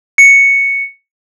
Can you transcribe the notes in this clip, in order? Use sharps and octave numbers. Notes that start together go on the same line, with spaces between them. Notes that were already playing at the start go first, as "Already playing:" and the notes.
C#7